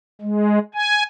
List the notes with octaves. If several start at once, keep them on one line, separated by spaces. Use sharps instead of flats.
G#3
G#5